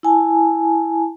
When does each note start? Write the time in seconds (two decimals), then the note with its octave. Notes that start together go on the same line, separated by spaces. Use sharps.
0.03 E4 G#5 A5